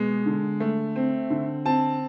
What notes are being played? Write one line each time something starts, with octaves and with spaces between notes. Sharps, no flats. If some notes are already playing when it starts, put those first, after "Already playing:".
Already playing: B2 G#3
D3
A3
C4
D3
C4 A5